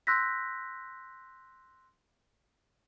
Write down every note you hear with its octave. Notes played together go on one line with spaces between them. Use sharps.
C6 E6 F#6 G6 A#6 B6